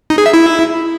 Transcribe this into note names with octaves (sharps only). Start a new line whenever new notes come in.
D#4
G#4
E5
E4